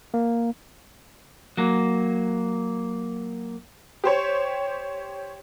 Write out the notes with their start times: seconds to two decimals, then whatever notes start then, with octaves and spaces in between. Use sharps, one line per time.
0.14 A#3
1.57 F#3 A#3
4.04 G4 C5 C#5